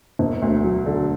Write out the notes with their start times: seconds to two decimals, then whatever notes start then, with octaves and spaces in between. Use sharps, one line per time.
0.19 E1
0.42 D2
0.64 F#3
0.86 D3